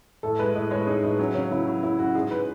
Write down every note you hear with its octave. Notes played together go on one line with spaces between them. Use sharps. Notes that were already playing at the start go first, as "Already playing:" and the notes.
A2 A4
G#3 B4
A2 D#5
G#3 C#5
D#4 G#4
A2 D#4
F#3 C#4
C#3 C#4
C#3 E4
F#3
F#3 E4
C#4 F#4
G#2 G#4
B4